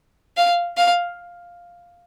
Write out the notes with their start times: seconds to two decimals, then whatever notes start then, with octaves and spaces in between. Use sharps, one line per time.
0.37 F5
0.77 F5